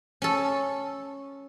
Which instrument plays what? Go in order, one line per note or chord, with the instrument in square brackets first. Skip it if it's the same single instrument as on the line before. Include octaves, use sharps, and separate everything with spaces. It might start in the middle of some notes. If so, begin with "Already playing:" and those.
[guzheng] C#4 A4